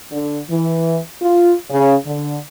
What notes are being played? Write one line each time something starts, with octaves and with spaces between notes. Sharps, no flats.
D3
E3
F4
C#3
D3